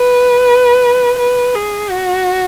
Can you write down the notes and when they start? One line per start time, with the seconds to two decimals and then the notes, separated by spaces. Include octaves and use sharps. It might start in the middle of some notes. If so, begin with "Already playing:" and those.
Already playing: B4
1.19 B4
1.55 G#4
1.91 F#4